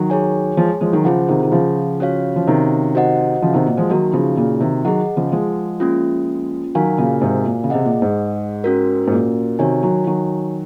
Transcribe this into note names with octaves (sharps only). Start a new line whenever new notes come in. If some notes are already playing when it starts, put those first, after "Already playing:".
Already playing: D#3 F#3
G#4 C#5 G#5
F3 G#3
F3 G#3
D#3 F#3
C#3 F3 F4 G#4 C5 F#5
C3 D#3
D#3
C#3 F3
C#4 F#4 C#5 F5
F3
C3 D#3
F#4 C5 D#5 F#5
C#3 F3
C3 D#3
A#2
F3 G#3
D#3 F#3 A#3 D#4 F#4
C#3 F3
A#2 C#3
C3 D#3
D#3 F#3 G#4 D#5 F#5
C#3 F3
F3 G#3
A#3 C#4 F4
D#3 F#3 F#4 A#4 F5 G#5
A#2 C#3
G#2 C3
A#2
C#3
C3 G#4 D#5 F#5
A#2
G#2
C#4 F#4 A#4
G#2
A#2
C3 D#3 F#4 C#5 G#5
D#3 F#3
D#3 F#3